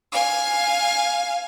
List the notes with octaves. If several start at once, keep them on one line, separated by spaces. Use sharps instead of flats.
F5 G#5